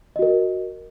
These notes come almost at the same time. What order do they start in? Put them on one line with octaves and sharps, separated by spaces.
D#5 F#4 A#4